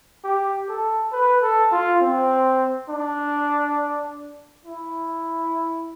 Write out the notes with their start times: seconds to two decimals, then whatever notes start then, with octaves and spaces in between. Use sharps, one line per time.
0.24 G4
0.69 A4
1.12 B4
1.42 A4
1.72 F4
2.01 C4
2.89 D4
4.66 E4